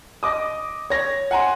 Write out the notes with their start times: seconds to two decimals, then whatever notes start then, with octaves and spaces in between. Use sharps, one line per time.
0.23 D#5 D6 D#6
0.90 C#5 A#6
1.31 F#5 G#5 A#5 C6